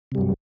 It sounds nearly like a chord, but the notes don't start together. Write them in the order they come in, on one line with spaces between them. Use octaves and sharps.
C3 G3 G2 F#3